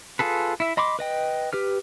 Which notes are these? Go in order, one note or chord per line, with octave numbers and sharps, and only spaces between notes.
F4 G#4 A4 B4
E4 E5
D#5 B5 C6 D6
B4 D#5 G5
G4 B4 F6